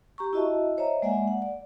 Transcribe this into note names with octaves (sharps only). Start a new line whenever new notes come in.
G4 A#5 C#6
E4 F#4 D#5 E5 A5
C5 C#5 D#5 E5 A#5
G#3 A#3 D5 E5 F#5 G#5
F#5
D5